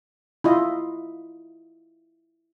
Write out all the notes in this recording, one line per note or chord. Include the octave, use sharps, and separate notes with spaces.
E4 F4 D#5